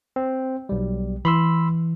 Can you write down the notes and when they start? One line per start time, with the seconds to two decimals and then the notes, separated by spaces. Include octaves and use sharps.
0.16 C4
0.69 B1 G3
1.25 E3 B5 C6 E6